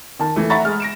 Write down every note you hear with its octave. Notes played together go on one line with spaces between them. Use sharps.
D#3 A5
E3 A3
E5 F#5 A#5 B5 C#6 A6
G#3 F6
A#6 D7 E7